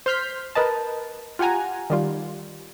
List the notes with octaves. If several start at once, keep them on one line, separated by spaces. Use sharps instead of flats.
C5 C6 F6 G6 B6
A#4 B4 D#5 A5
F4 G4 F#5 G#5 A#5
D#3 G3 F4